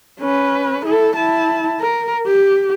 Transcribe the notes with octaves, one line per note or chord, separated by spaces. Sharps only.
C#4 B4
E4 A4
E4 A5
A#4
G4